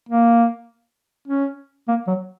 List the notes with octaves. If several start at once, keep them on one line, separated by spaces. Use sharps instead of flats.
A#3
C#4
A#3
F#3